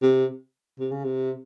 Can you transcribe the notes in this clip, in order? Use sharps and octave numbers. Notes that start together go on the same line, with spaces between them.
C3
C3
C#3
C3